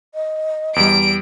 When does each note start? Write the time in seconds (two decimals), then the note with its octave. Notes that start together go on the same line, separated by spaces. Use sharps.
0.14 D#5
0.76 E2 G3 D7